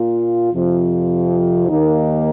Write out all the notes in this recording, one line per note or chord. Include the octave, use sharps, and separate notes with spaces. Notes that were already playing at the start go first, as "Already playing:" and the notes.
Already playing: A#2 A#3 F4
F2 C3 F3
D#2 D#3 A#3 D#4